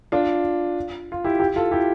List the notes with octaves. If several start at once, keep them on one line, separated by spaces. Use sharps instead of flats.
D4 F4
F4
E4 G4
E4 G4
F4 A4
E4 G4